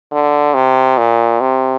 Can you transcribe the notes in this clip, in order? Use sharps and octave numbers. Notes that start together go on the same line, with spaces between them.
D3
C3
A#2
C3